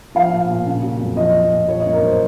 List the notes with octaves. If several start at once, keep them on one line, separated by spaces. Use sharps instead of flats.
F3 F5
A#2
A#2
C#3
F#3
F2
F3 D#5
A#2
A#2
F3 C#5
D#5
F#2
A#4
F#2 C5